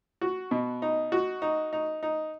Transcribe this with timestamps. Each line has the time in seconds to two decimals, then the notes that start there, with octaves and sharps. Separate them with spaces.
0.21 F#4
0.51 B2
0.82 D#4
1.12 F#4
1.42 D#4
1.73 D#4
2.03 D#4